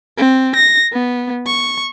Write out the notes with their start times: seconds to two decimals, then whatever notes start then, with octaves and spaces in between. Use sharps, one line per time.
0.18 C4
0.55 A#6
0.93 B3
1.46 C#6